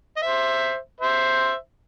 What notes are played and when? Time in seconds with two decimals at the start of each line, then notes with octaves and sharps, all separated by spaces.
0.17 D#5
0.22 C5 E5
1.00 C5 E5